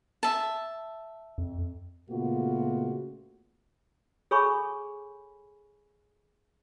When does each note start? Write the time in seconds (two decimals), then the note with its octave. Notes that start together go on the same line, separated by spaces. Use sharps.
0.23 E5 A5
1.38 F2
2.10 A#2 C#3 A3 B3 F4 F#4
4.31 G#4 A4 C#5 G#5 B5 C#6